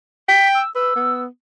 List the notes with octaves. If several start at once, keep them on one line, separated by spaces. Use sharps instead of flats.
G5 B6
E6
B4 E6
B3